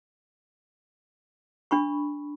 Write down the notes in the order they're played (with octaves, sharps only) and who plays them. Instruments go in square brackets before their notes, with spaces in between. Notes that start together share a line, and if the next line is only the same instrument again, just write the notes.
[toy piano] D4 B5 C#6